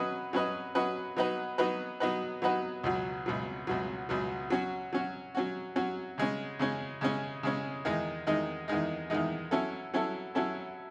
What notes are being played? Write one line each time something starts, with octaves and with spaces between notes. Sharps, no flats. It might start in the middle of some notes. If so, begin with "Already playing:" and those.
Already playing: F#3 C#4 F#4 B4 D#5
F#3 C#4 F#4 B4 D#5
F#3 C#4 F#4 B4 D#5
F#3 B3 D#4 F#4 B4
F#3 B3 D#4 F#4 B4
F#3 B3 D#4 F#4 B4
F#3 B3 D#4 F#4 B4
C#2 B2 F#3
C#2 B2 F#3
C#2 B2 F#3
C#2 B2 F#3
F#3 C#4 F#4
F#3 C#4 F#4
F#3 C#4 F#4
F#3 C#4 F#4
C#3 G#3 C#4
C#3 G#3 C#4
C#3 G#3 C#4
C#3 G#3 C#4
E2 D#3 G#3 D#4
E2 D#3 G#3 D#4
E2 D#3 G#3 D#4
E2 D#3 G#3 D#4
F#3 C#4 E4 A4
F#3 C#4 E4 A4
F#3 C#4 E4 A4